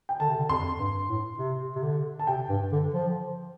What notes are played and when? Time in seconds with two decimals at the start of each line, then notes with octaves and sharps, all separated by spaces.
0.09 G5
0.20 D3 A5
0.29 C3
0.38 D3
0.49 F2 C6
0.79 G2
1.09 A2
1.38 C3
1.76 C3
1.82 D3
2.19 A5
2.27 C3 G5
2.49 G2
2.72 D3
2.94 F3